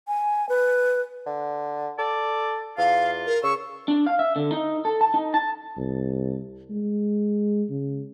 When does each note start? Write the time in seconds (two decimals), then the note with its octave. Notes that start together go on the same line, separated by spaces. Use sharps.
0.08 G#5
0.49 B4
1.26 D3
1.99 A4 D5
2.78 E2 F4 F5
3.27 A#4
3.43 C#3 C#6 E6
3.88 D4
4.06 F5
4.19 E5
4.36 D3
4.52 D#4
4.85 A4
5.01 A5
5.14 D#4
5.34 A5
5.77 C2
6.70 G#3
7.70 C#3